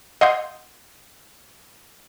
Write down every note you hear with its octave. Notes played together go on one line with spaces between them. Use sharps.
D#5 F5 F#5 C6 D#6 G6